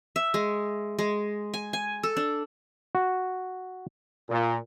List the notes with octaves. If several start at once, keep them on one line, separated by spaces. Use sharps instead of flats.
E5
G#3
G#3
G#5
G#5
A4
D4
F#4
A#2